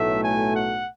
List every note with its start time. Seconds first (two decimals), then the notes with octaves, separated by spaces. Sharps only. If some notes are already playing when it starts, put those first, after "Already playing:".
Already playing: B1 A2 F#3 A3 E5
0.24 G#5
0.55 F#5